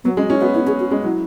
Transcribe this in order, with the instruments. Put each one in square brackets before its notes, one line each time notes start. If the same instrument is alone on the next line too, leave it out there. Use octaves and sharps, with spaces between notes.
[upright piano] F#3 [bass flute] B3
[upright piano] G#3 [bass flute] C#4
[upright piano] C#4 [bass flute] E4
[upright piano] B3 [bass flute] F#4
[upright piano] B3 [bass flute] E4
[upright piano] C#4 [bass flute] G#4
[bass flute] F#4
[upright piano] G#3 [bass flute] C#4
[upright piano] F#3 [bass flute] E4